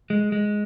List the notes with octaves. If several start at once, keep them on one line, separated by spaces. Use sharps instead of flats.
G#3
G#3